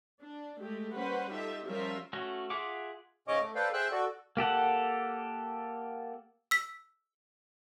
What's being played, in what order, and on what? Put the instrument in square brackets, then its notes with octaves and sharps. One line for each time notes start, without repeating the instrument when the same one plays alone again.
[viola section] D4
G#3 A3 G4
G3 A#3 C#4 B4 C5 F#5
D#4 F4 G4 A4 E5
F3 G3 C#4 F4 A#4 E5
[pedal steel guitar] A3 C#4 F#4
F4 G#4 E5 F#5 D6
[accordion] G#2 C#3 C#4 C#5 D#5 D6
A3
A4 B4 C5 D5 F5 G5
G#4 C5 E5 G5 E6 F#6
F#4 A4 D5
[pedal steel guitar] A#3 G4 A4 F#5
[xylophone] E6 B6